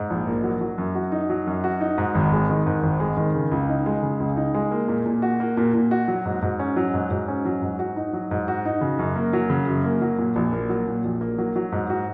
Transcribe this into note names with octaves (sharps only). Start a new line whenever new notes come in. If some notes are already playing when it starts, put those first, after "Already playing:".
Already playing: G#2
A#1
A#3
F#3
F#3
F#2
F#4
D#4
F#3
F#2
F#4
D#4
G#2
G#1
G#3
D#3
G#2
G#1
G#3
D#3
C#3
C#2
D#4
G#3
C#3
C#2
D#4
G#3
A#3
A#2
A#2
F#4
A#3
A#2
A#2
F#4
F#3
G#2
G#2
C#4
F#3
G#2
G#2
C#4
F#3
G#2
F#4
D#4
F#3
G#2
F#4
D#4
C#3
F#2
A#3
F#3
C#3
F#2
A#3
F#3
A#2
A#1
A#3
F#3
A#2
A#1
A#3
F#3
F#3
G#2
F#4